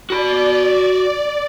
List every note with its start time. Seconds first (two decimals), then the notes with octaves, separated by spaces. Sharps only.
0.10 F#4 D5 B5